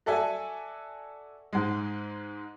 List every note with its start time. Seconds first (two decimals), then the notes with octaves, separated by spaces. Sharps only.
0.06 F#4 A4 D5 E5 G#5
1.53 G#2 G#3